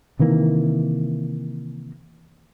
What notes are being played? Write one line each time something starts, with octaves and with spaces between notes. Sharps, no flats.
C3 D#3 E3 A#3